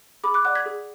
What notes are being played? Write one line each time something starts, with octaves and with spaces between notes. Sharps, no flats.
G#4 B5 D6
D6 F#6
D5 F#5 D6 F#6
G#6 B6
G#4